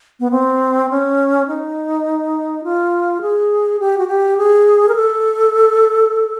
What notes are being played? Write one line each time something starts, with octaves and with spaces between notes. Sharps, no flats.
B3
C4
C#4
D#4
F4
G#4
G4
F#4
G4
G#4
A#4
A4